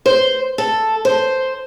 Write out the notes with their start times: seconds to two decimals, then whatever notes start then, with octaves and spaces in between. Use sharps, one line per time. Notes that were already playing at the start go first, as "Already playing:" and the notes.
0.06 C5
0.58 A4
1.05 C5